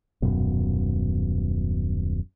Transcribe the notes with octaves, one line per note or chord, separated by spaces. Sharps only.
D#1 F#2 B2